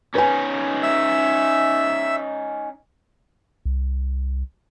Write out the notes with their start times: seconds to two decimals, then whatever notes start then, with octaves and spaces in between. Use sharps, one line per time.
0.15 C#4 D#4 B4 G#5
0.83 E5 E6
3.65 C2